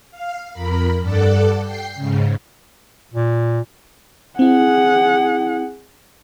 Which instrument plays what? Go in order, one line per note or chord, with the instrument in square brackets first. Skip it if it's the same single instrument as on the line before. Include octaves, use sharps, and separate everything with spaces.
[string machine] F5
F2 A#4 B5
G2 A4 D5 F#5
G5 C7
G#2 C#3
[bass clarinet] A#2
[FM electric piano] C4 E4 [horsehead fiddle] G#4 F#5